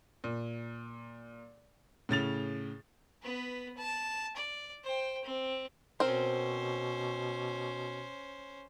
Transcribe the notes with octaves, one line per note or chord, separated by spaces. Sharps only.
A#2
A2 C#3 A6 F7
B3 B4
A5
D5
C5 G5
C4
B2 C4 C#4 A#4 C5